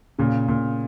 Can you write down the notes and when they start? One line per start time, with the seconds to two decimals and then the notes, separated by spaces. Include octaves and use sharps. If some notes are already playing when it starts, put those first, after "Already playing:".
0.19 A#2 C#3
0.48 A#2